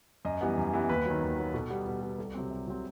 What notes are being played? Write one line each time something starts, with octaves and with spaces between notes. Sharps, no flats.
F#2 D#5
E3 G3 B3
F#2
E3 G3 B3
D#2 B4
D#3 F#3
D#2
D#3 F#3
B2 A4
G3 B3
B2
G3 B3
C2 A4
C3 F#3 C4
C2
C3 F#3 C4